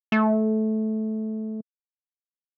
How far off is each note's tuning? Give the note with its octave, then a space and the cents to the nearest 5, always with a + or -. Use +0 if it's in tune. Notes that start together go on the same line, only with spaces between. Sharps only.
A3 -15